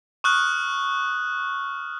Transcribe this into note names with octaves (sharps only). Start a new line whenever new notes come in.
C#6 D#6 F6 F#6